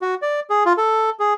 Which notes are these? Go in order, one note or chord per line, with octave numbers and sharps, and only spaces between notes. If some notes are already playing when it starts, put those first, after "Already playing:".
F#4
D5
G#4
F4
A4
G#4